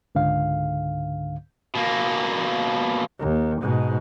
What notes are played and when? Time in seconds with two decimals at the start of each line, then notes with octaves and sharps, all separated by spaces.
0.15 C#2 G#2 D3 F5
1.75 B2 A#3
3.20 D#2
3.62 G#2 B2